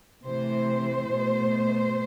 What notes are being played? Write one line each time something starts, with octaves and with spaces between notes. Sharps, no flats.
C3 E3 A3 C5
B2 A3